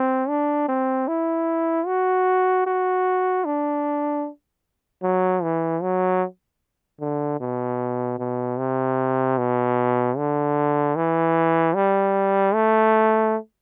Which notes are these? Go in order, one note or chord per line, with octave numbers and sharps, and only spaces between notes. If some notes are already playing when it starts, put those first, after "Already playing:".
Already playing: C4
D4
C4
E4
F#4
F#4
D4
F#3
E3
F#3
D3
B2
B2
C3
B2
D3
E3
G3
A3